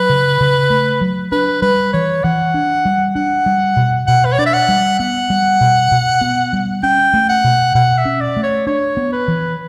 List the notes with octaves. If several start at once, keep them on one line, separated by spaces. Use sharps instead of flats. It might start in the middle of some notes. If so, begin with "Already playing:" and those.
Already playing: F#3 B4
C#3
C#3
A3
F#3
D4 B4
G3 B4
E3 C#5
E3 F#5
D4
G3
D4 F#5
G3
B2
B2 F#5
B4
C#5
D4 D5
E5
F#5
G3
B3 F#5
G3
B2
B2
B3
G3
C#4 G5
A3
F#5
B2
B2 F#5
E5
C#4
D5
A3
C#5
D4 C#5
B3
B4
E3